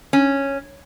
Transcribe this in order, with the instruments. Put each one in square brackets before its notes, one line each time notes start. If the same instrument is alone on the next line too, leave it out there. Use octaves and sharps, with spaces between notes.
[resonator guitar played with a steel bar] C#4